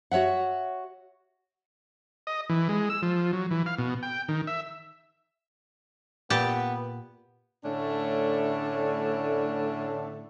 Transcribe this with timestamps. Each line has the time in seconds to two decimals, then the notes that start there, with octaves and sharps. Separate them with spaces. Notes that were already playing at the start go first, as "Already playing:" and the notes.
0.11 F#4 C#5 E5 F#5
2.27 D#5
2.49 E3
2.69 G#3
2.90 E6
3.02 F3
3.33 F#3
3.51 E3
3.66 F5
3.78 B2
4.03 G5
4.29 D#3
4.47 E5
6.30 A#2 B3 G4 A5
7.64 A2 D3 A3 C#4 D4